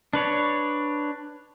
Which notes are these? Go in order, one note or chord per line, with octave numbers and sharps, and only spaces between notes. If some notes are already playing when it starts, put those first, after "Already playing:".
D4 B4 C#5